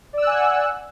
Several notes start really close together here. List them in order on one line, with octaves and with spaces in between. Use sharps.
D5 E6 F#6 G#5 F#5